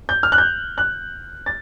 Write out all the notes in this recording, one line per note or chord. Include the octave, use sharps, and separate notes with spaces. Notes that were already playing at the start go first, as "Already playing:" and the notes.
G6
F6
F#6
G6
F#6
A6